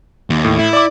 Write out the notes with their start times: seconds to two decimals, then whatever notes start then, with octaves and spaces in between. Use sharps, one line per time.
0.30 D#2
0.45 A2
0.58 E4
0.73 D5 D6